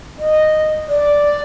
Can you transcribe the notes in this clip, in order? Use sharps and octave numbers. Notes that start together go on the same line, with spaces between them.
D#5
D5